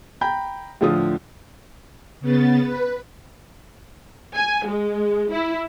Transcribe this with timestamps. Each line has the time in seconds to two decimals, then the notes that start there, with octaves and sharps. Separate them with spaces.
0.21 G5 A#5 B5 G6
0.81 A2 D3 F3 F4 D#6
2.21 C#3 B3 A6
2.62 B4
4.35 G#5
4.67 G#3
5.31 E4